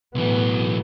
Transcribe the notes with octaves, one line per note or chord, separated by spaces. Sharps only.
B1 A2 E3 B3